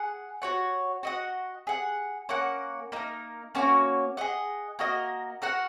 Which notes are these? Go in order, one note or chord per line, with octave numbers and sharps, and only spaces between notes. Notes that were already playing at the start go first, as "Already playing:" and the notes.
Already playing: G#4 F#5
F#4 C#5 F#5
F#4 D#5 F#5
G#4 F#5
A#3 C#4 A#4 F#5
A#3 D#4 A#4
A#3 C#4 F#4 C#5
G#4 D#5 F#5
A#3 F#4 A#4 D#5
F#4 A#4 F#5